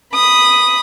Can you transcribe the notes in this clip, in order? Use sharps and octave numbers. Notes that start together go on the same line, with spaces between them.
B5 D#6